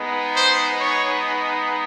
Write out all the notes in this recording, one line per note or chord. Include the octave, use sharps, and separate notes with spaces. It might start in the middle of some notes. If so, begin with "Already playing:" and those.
Already playing: G#3 B3 D#4
C5
C#5